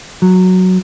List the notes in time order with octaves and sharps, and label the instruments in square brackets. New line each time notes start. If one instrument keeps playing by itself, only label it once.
[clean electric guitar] F#3